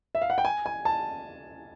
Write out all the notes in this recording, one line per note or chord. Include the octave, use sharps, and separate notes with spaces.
E5
F5
F#5
G5
G#5
G#5
A5